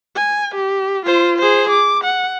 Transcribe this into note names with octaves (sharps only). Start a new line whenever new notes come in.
G#5
G4
F4 C5
G#4 C5
D6
F#5